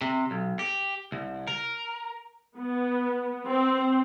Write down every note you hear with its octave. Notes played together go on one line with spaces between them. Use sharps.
C3
B1
G4
C2
A#4
B3
C4